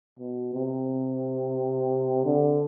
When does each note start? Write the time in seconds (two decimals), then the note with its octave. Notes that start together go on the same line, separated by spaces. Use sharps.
0.19 B2
0.53 C3
2.25 D3